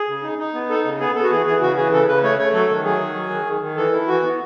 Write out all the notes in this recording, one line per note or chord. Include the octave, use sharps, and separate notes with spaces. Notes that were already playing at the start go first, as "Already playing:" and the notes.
Already playing: G#4
C#3
D#4
D#4
B3
D#4 A4
C#3
B3 G#4
B3 A4
F#4
E3 G#4
E3 G#4
C#3 F#4
E3 G#4
C#3 A4
C#3 B4
A3 C#5
A3 C#5
F#3 A4
D#3
F#3 G#4
D#3
F#3
D#3
D#3
D#3
E3 A4
E4
E3 F#4
B3